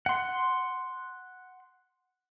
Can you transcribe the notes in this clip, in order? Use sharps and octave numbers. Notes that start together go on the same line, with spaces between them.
F#5 C6